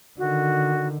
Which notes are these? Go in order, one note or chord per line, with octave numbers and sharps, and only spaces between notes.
D3 D#3 F#4